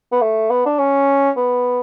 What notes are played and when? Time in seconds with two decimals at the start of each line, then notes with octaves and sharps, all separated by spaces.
0.12 B3
0.22 A3
0.50 B3
0.66 D4
0.79 C#4
1.37 B3